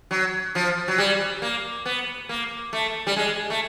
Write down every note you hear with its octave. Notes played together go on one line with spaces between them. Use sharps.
F#3
F3
F#3
G3
A#3
B3
A#3
A3
G3
G#3
A3